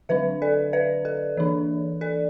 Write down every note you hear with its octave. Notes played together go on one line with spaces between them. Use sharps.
D3 F#3 D4 B4 E5
A4 D5
B4 E5
A4
E3 D4
A4 D5